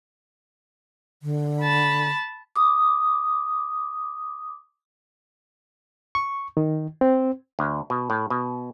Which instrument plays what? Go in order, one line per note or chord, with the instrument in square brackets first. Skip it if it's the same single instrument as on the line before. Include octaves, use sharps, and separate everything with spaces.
[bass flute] D3
[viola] A5 B5
[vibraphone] D6 D#6
[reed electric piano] C#6
D#3
C4
[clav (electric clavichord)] D2
B2
A2
B2